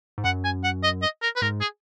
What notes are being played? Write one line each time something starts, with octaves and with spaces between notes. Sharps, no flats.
G#2
F#2 F#5
G#5
F#5
D#5
D#5
A#4
B4
G#2 A#4
G#4